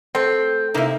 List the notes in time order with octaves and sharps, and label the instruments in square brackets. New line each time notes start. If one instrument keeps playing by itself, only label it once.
[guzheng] A3 [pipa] C4
[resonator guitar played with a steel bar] C3 A#3 E4 [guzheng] D#4 D#5